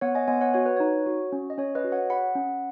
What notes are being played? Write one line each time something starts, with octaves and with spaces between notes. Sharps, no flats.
B3 C#5 F#5
D#5 G#5
B3 D#5 G#5
C#5 F#5
F#4 C#5
B4
D#4 C#5
F#4
C#4
D#5
C#4 C#5
B4 D#5
F#4
C#5 F#5
G#4 F#5 B5
C#4